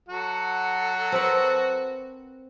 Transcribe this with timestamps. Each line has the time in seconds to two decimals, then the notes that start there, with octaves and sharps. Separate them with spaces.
0.08 F#3 F#4 A4
1.12 C4 A#4 B4